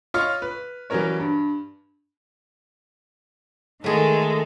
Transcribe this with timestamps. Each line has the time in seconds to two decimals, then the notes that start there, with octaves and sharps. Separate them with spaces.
0.14 F4 C#5 D#5 F5 C#6 F6
0.42 B4
0.90 E3 F#3 G3 C#4 A#4 C#5
1.20 G2
3.84 D#3 G#3 A3 G#4 A4